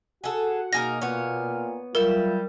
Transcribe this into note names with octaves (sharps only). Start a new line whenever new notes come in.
F#4 G#4 A4 F#5
B2 A#3 D#4 G#4 A#4 F6 A#6
A#2 B3 C#5
F#3 G3 F4 A#4 E5